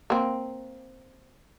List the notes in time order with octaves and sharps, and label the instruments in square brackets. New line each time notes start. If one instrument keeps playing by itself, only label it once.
[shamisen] A#3 C4